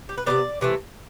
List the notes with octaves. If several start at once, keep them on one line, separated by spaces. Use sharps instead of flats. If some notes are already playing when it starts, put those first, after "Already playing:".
G4
B4
C3 G3 B3 D5
C3 E3 A3